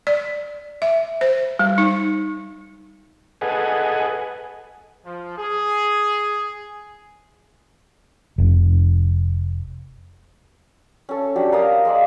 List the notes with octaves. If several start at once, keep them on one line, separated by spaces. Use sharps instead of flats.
D5
E5
C5
G3
D#4
G#4 A4 B4 D#5 F#5 G#5
F3
G#4
F1
C#4 A4
F#3 D4 G4
A#4 D#5 F5 D#6
G#3 A#3 D5